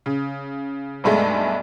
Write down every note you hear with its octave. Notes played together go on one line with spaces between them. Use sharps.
C#3
B1 G2 G#3 A3